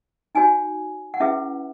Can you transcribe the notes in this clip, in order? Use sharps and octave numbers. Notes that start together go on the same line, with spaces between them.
D#4 F#4 C#5 G#5
F#5
C#4 E4 G#4 B4 E5